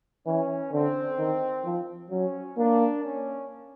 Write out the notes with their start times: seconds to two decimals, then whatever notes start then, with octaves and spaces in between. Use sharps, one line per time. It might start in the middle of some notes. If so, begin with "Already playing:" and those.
0.26 E3 C#4
0.72 D3 C4
1.18 D#3
1.65 F3
2.11 F#3 C#4
2.57 A#3 D4
3.04 C#4